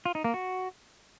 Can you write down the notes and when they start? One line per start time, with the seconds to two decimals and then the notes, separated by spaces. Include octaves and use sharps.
0.05 F4
0.15 D#4
0.24 A#3
0.34 F#4